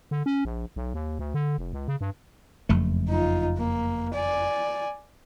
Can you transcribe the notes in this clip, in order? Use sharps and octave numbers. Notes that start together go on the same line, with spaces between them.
D3
C#4
A#1
B1
D#2
D2
D3
F1
C#2
C#3
G2
F#1 F2 A3
D#4 F4
A#3
D5 G#5